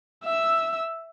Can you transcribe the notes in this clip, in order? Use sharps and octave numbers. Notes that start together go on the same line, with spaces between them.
E5 E6